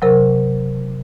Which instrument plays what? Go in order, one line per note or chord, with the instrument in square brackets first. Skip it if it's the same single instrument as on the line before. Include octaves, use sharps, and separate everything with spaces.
[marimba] C3 F#3 A#4